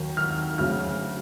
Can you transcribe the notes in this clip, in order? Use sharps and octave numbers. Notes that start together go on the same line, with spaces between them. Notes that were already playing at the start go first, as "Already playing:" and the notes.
Already playing: D#2 D#3 F#3
F6
D2 C#3 F#3 F6